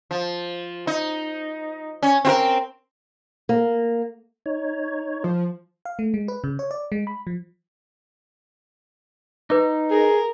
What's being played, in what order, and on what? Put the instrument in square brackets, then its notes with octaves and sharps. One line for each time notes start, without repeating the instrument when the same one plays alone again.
[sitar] F3
D#4
C#4
C4 F4 A#4
[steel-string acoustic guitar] A#3
[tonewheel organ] D#4 C#5
[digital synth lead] F3
[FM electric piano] F5
A3
G#3
B4
C#3
C#5
D5
G#3
B5
F3
[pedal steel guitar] D#4 [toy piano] B4 D6
[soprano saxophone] G#4 [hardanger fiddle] A#4